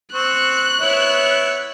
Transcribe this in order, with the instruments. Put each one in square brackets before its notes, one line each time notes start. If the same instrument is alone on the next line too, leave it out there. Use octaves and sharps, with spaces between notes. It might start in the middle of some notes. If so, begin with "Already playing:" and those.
[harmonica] C4 C#6 [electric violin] F#6
[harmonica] B3 E4 C#5